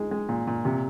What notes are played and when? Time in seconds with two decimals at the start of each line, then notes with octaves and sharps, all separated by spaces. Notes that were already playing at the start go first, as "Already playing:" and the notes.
Already playing: G#3 D#4
0.11 G#3
0.29 A#2
0.47 A#2
0.65 C3